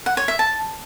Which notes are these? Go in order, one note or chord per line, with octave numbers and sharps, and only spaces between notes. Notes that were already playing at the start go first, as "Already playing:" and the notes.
F#5
C#5
E5
A5